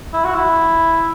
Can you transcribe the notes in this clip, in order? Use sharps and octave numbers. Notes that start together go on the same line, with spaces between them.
E4
F#4
E4